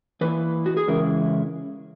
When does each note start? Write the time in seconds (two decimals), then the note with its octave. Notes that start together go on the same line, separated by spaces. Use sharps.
0.21 E3 A#3 E4 B4
0.66 F#4
0.77 G#4
0.87 C#3 E3 G#3 C#4 E4 A#4